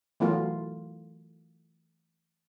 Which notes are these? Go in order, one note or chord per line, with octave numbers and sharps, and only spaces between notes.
E3 F#3 A3 B3 F4 A#4